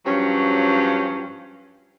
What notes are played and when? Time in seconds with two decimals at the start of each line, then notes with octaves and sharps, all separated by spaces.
0.06 G2 F3 F#3 C#4